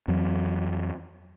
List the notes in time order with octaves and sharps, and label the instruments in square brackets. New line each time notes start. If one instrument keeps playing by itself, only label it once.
[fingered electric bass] F2 E3 F#3